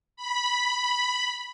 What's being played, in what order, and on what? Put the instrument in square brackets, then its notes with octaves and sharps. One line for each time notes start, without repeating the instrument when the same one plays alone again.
[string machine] B5